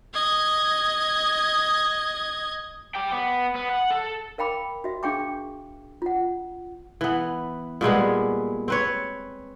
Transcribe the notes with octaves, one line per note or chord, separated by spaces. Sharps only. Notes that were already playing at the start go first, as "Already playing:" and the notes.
D#5 G#6
D5 G5
B3
B3
F#5
A4
A#4 F5 G5 B5 D6
F#4 E5
D4 G#4 F5 G5 C#6 D6
F4 F#5
E3 B3
A#2 G3 G#3 B3
C4 B4 C#5